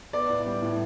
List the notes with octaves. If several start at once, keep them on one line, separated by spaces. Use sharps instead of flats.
B3 D5
A2
G3
A2